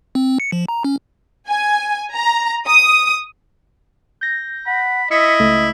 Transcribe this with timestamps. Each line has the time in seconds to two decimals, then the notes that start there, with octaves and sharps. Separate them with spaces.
0.15 C4
0.40 C#7
0.52 F3
0.68 A#5
0.84 C#4
1.48 G#5
2.15 A#5
2.68 D#6
4.21 G6 A#6
4.67 F#5 B5
5.11 E4 D#5 E6 B6 C#7
5.40 C#2 A3